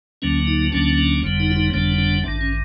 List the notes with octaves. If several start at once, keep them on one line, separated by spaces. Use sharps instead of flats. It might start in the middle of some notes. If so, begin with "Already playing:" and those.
D2 D3 F#3 A#3 C#4
D#4
D2 D3 F#3 A#3 C#4 D4
D4
F#1 F2 D3 G3 B3
D#4
E4
D#4
F#1 F2 D3 G3 B3 D4
D4
A1 G2 D#3 D4
C#4